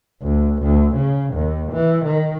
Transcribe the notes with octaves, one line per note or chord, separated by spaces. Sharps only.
D2
D2
C#3
D#2
E3
D#3